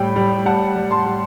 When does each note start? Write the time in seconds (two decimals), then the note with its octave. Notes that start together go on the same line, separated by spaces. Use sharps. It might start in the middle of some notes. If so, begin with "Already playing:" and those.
Already playing: A2 G3 G5 B5
0.16 G3
0.45 G3 F#5 A5
0.76 G3
0.91 A5 C6
1.06 G3